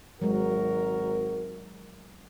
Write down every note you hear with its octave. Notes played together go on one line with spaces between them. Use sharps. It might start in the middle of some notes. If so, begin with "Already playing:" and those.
G#1 F#3 G#3 F#4 A#4